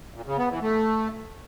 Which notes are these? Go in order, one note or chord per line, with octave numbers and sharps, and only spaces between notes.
A#2
C#3
B3
E3
A3